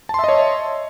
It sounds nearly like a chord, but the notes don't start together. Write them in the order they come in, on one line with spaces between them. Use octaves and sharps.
A5 C6 E5 D#5 C#5